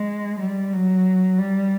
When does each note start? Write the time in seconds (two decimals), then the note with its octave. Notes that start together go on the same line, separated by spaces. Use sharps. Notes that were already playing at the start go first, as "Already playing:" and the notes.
Already playing: G#3
0.40 G3
0.73 F#3
1.38 G3